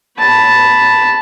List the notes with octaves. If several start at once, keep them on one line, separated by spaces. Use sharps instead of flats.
A5 B5